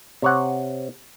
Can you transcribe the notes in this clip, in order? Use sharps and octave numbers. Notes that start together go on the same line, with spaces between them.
C3 C#5 F#5